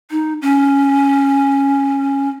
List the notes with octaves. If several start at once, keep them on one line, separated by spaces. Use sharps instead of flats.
D#4
C#4